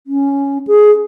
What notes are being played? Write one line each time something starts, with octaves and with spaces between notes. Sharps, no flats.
C#4
G#4